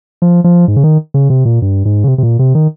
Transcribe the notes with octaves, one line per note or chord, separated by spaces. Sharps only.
F3
F3
G#2
C#3
D#3
C#3
C3
A#2
G2
G#2
C#3
C3
C3
A#2
C3
D#3